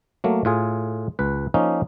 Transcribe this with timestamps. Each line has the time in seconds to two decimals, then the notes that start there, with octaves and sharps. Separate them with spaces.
0.24 F#3 A3 A#3
0.45 A2 F4 G#4
1.19 C#2 B4
1.54 F3 A#3 C#4 D#4